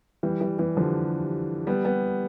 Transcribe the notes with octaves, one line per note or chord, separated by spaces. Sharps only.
E3 G3
E3 G3
E3 G3
D3 F3
G3 B3
G3 B3